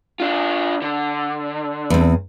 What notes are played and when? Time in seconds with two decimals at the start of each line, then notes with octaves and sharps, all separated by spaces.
0.20 D4 F4
0.82 D3
1.90 E2 C4